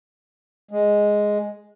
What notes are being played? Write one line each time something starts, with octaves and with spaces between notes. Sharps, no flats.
G#3